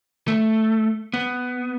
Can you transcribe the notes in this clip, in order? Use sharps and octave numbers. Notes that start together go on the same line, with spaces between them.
A3
B3